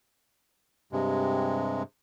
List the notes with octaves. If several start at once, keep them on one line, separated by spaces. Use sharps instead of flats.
G2 C3 G#3